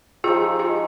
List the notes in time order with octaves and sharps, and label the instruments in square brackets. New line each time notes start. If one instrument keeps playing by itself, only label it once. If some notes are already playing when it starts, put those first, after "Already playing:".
[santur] F3 G#3 D#4 G4 [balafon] F4 G#4
[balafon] F4 G#4